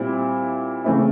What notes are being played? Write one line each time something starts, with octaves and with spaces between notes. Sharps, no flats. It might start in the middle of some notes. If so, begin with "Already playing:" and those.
Already playing: A#2 G3 C4 E4
C#3 E3 A3 C4 E4